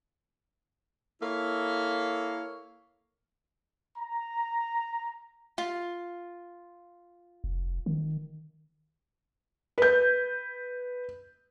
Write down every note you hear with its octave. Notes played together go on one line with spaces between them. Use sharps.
A#3 E4 A4 C#5 F5
A#5
F4
F1
D#3
B4 G6